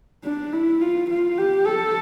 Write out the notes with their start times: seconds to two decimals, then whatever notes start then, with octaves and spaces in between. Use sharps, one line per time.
0.24 D4
0.53 E4
0.81 F4
1.10 F4
1.38 G4
1.66 A4